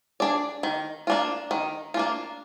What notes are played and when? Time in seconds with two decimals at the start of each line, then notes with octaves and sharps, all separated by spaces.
0.20 D4 G#4 D5
0.63 D#3
1.07 A#3 D4 F4
1.51 D#3
1.94 A#3 D4 F4